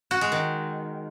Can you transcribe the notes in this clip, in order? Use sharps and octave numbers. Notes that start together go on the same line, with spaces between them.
F#4
G#3
D#3